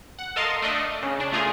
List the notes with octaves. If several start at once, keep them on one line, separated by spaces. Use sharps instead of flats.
F#5
A4 A#4 D#5 F5 C6 A6
A3 D4 D#5
C#3
D4
A3 F4 G#4 A#4